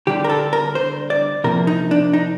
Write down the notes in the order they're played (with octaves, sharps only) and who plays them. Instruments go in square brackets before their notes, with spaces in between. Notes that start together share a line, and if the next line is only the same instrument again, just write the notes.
[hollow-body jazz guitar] D3 G3 D4 G4
A#4
A4
A#4
C5
D5
C3 F3 A#3 A#4
D#4
D4
D#4